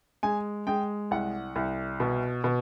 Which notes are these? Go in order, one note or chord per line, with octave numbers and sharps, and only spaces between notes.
G#3 G#5
G#3 G5
C2 F#5
C2
B2
B2